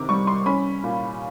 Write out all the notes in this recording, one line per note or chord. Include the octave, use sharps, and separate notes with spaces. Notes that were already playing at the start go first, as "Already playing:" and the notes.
Already playing: C3 D#3 A#5 D6
G3 C#6
C6
C#4 B5
A#2